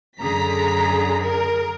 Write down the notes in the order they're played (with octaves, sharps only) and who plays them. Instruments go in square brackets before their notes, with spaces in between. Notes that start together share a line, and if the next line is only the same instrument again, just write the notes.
[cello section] F#2 D3 G#4 [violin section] A#5 B6
[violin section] A#4